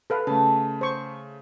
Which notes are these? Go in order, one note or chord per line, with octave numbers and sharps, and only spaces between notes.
A4 B4 F5
C#3 A3 A5
C5 C#6